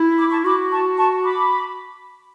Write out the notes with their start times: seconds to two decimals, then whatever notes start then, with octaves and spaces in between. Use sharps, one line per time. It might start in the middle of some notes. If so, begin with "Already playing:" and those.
Already playing: E4
0.18 B5 D6
0.31 A5 C#6
0.44 F#4 B5 D6
0.71 A5 C#6
0.97 A5 C#6
1.23 B5 D6